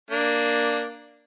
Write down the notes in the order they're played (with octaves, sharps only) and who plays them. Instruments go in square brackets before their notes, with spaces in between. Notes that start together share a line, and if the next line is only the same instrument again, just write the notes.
[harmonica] A#3 D4